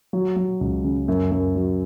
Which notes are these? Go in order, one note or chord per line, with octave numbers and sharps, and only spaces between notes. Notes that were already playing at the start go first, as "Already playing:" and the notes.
F#3
F#3
C#2
C#3
F#2
F#2
F#3